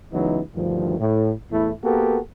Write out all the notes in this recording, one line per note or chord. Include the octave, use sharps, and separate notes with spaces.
C#2 E3 F#3 B3 D#4
D2 G2 D#3 F3
A2
E2 A2 A3 E4
A#3 B3 F#4 G4 A4 A#4